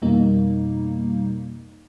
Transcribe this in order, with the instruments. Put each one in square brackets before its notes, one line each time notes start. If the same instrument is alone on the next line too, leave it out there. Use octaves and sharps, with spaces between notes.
[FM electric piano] F2 B2 G3 A#3 D#4